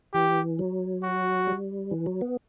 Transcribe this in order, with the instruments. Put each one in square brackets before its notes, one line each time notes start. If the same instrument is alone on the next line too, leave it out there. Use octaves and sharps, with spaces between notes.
[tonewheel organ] E3 [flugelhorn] G4
[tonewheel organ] F#3
[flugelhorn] F#4
[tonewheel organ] G3
E3
F#3
B3